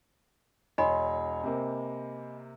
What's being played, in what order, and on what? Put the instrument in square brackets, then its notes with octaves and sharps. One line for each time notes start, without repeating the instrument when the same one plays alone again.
[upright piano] E1 C#5 C6 [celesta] D#5 G#5 B5
[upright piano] C3 A#3 C4